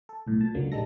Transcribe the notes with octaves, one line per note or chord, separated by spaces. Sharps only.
A4
B1 A2
A#2 A5
C#2 D3 F#3 A#3
A#1 G3 G#3 D#4 A4 A#6